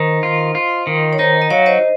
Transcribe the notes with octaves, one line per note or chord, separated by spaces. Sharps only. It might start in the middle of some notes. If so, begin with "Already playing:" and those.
Already playing: D#3 C5 D#5
F4
F4
D#3
C#5
D#4 C5 D#5
D#5
F#3 C#5 F5
C5 D#5